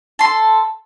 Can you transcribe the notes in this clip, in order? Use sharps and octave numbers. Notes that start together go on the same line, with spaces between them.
A4 C6